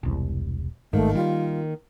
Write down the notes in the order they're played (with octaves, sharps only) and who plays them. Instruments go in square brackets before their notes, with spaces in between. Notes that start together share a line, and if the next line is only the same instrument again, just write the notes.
[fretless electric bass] E1 C2
[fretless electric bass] G#1 G#2 [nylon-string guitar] D#3 A#3 [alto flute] A3
[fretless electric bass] G3 [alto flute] F4